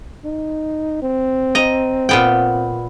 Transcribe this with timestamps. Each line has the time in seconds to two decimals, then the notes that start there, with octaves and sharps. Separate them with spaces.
0.24 D#4
1.02 C4
1.55 D#5 A#5
2.09 A#2 B3 G5